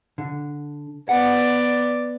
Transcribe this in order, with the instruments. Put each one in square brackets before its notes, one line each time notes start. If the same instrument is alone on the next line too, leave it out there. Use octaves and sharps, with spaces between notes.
[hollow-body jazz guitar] D3
[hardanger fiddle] B3 D5 [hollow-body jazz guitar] F#5